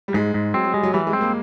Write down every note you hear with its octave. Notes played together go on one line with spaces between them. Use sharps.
G3
G#2 G#3
G#2
F#3 C4
F#3
G3 G#3
F#3
E3 G3
G#3
C4
A#3